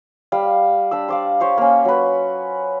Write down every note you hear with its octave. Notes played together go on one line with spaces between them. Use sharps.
G3 F5
D4 G4 E6
C5 D5 F5
G4 C5 C#5 F5
A#3 C#4
F#3 B4